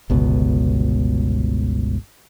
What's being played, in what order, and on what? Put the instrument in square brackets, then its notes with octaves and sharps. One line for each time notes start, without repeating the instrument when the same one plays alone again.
[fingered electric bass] G1 C#2 B2